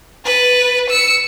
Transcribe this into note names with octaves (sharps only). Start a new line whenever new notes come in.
B4 A6
E6 C#7